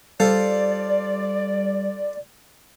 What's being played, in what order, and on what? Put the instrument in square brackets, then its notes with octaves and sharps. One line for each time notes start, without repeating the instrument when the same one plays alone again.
[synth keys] G3 [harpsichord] F4 A4 C5 [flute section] D5